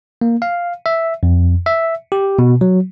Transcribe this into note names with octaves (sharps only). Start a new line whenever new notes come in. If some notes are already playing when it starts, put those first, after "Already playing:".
A#3
F5
E5
F2
E5
G4
B2
F#3